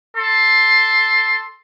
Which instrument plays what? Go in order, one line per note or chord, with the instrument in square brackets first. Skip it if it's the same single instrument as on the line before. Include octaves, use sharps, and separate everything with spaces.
[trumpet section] A4 C6